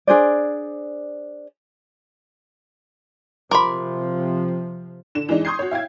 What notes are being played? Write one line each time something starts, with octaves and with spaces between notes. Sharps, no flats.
D4 G#4 C5 D5
C3 F3 A#4 B5 C6 D6
D3 E7
E3 G#3 D4 D#4
C6 C#6 D#6 G6 G#6 C7
F#4 C#5
E5 F5 G5 G#6